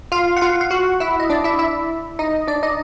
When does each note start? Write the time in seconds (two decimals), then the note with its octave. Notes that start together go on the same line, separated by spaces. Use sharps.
0.12 F4 F5
0.36 F#5
0.41 F4 F5
0.61 F5
0.71 F#4 F#5
1.00 E4 E5
1.20 D#5
1.30 D4 D5
1.44 E4 E5
1.59 E4 E5
2.19 D#4 D#5
2.48 D4 D5
2.63 D#4 D#5